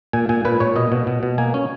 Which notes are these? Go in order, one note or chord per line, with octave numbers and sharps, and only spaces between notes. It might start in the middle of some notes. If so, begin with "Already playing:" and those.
A#2 G#5
A#2 G#5
A#2 B4
A#2 C#5
B2 D#5
B2
B2
B2
A#3 G#5
C#4